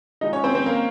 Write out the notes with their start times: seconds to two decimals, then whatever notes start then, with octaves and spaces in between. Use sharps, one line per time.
0.21 F3 G#3 D#4 D#5
0.33 C#4 C#5
0.44 C4 C5
0.55 C4 C5
0.66 A#3 A#4